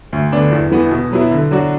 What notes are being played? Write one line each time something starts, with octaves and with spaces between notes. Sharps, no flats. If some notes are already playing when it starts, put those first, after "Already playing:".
D2
D3 B3 D4
E2
E3 B3 F#4
B2
F#3 B3 E4
D3
F#3 D4 F#4